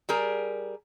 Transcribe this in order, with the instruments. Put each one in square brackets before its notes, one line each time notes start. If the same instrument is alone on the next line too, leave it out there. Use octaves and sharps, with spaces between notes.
[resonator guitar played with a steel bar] G3 G#4 A#4